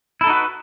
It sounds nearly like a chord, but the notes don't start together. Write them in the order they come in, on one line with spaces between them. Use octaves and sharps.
E4 A4 D#4 F#4 B4